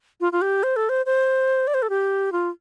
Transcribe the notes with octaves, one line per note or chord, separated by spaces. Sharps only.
F4
F4
G4
C5
A4
C5
C5
D5
C5
A4
G4
F4